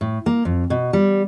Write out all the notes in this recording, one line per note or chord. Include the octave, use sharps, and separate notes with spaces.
A2
A#3
F2
B2
G3